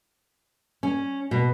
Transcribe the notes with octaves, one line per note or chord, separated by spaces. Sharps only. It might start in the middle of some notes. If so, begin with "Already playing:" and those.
C#4
B2